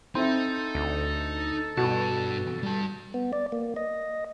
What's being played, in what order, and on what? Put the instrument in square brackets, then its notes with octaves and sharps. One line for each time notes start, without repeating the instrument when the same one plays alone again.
[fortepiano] C4 E4 [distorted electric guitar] D#4 [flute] A4
[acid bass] D2
[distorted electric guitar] G2 A5 [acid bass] B2 [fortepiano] F#4
[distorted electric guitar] G3 A5
[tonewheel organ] B3
D5
A#3
D#5